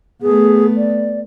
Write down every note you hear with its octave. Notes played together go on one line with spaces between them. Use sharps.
A3 B3 G#4
D5